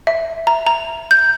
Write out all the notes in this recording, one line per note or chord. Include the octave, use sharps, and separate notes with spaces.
E5
A#5
A#5
G6